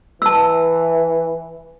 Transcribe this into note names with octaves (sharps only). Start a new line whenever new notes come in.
E3 A5 E6